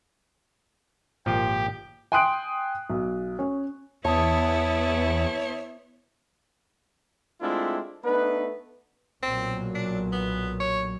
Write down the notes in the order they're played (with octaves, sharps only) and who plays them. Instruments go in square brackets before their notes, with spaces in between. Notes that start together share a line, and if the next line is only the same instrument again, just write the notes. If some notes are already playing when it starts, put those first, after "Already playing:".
[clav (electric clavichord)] G#1 A#2 F3 [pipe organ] G4
[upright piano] G5 G#5 C6 D#6 F#6 D7
B1
C#4
[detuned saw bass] E2 [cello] B3 E4 [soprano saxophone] C#5 [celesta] A5 D#6
[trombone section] G#3 A3 C4 D4 E4 F4
A3 B3 D4 D#4 B4
[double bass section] B1 A#2 F#3 [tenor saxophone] C4
[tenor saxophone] D4
B3
C#5